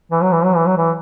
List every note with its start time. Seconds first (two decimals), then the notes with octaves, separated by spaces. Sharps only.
0.12 E3
0.22 F#3
0.33 E3
0.44 F#3
0.56 E3
0.66 F#3
0.78 E3